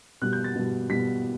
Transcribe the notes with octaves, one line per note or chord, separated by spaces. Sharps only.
B2 G3 F#6
G6
A6
B2 G3
B2 G3 B6